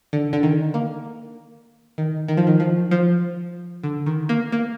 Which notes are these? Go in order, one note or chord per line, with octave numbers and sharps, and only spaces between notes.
D3
D3
D#3
A#3
D#3
D#3
F3
D#3
F3
F3
D3
D#3
A#3
A#3